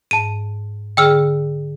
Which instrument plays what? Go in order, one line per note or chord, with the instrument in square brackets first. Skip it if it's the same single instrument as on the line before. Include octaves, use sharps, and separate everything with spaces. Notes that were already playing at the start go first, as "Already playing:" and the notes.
[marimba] G#2 [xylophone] A5 D#7
[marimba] D3 G#4 [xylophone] G5 E6 F6